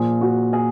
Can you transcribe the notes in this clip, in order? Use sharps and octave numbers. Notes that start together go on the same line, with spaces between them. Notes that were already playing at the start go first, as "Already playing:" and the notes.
Already playing: A#2 F3 G#4
F#4
G#4